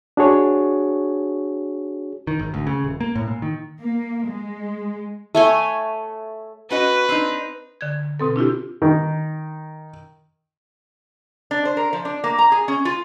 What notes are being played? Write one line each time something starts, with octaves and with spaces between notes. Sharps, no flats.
D4 F#4 G#4 C#5
D#3
G#1
D2
C#3
D#1
A#3
A2
A#2
D#3
A#3
G#3
A3 C#5 G#5
C#4 F#4 B4 D#5
C4 D4 D#4
D3 G#6
B2 C4 A4
D4 E4 F4 G4
D#3
D4
C5
A#4
F3
D4
A#3
A#5
G#4
C#4
F4